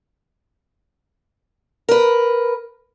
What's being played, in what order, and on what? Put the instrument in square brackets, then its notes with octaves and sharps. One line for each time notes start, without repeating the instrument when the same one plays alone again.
[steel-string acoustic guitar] A#4 B4